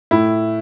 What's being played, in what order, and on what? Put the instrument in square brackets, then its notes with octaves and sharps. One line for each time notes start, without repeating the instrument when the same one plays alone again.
[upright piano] A2 E4